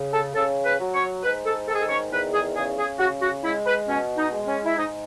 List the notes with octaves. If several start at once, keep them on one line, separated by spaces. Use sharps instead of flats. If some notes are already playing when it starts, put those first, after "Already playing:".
Already playing: C#3
A4
C#3 A4
B4
F#3
C#5
G#2 B4
A4
D#3 A4
G#4
A4
C#5
E2 B4
G#4
C#3 G#4
G#4
C#3 F#4
F#4
G#3 E4
B4
B2 C#4
D#4
G#3
C#4
E4
G#2 D#4